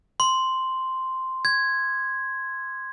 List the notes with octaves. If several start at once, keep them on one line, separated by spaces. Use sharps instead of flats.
C6
G#6